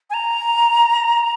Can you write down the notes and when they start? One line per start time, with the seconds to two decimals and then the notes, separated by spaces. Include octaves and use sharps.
0.10 G#5
0.14 A#5